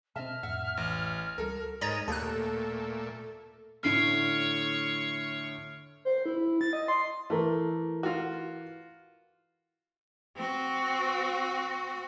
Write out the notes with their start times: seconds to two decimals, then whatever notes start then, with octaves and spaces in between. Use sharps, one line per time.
0.16 B2 C4 D#5 E5 A5 F6
0.43 F2 A2 E5 F#5
0.77 A1
1.38 C#2 G3 F#4 A4 A#4
1.81 G#2 A#4 C#5 D#5 A#5 A6
2.08 D#2 A#2 A3 A4 F#6
3.83 A2 D3 A3 C#5 F6 C7 D7
6.05 C5
6.26 E4
6.61 A6
6.73 D#5
6.88 C6
7.30 E3 A3 A4 A#4
8.03 F4 F#4
10.36 C4 F#4